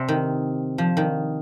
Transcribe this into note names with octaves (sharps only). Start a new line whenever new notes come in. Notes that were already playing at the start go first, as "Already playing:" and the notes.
Already playing: C3
D#3
F3
D#3